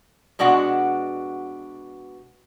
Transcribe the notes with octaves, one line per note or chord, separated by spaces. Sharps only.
B2 G#3 D4 F#4 F#5